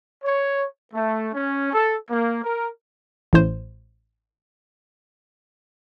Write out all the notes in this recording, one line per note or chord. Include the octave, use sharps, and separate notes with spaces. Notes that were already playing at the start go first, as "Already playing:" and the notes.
C#5
A3
C#4
A4
A#3
A#4
A1 A2 C5